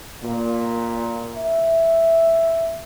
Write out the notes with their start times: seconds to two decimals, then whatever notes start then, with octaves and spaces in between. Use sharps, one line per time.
0.23 A#2
1.36 E5